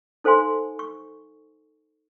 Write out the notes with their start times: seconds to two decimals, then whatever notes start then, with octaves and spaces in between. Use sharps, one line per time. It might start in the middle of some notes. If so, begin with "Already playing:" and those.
0.24 D#4 A4 C5 F5 G#5 C6
0.79 C#6